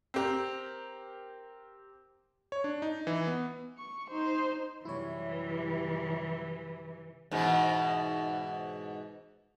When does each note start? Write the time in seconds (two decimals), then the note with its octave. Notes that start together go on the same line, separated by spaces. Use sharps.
0.14 C4 G4 A#4
2.52 C#5
2.64 D4
2.82 D#4
3.07 E3
3.27 B3
3.78 C#6
4.10 D#4 C5
4.85 F#2 C3 E3 G3 E4 C#5
7.31 G#2 B2 E3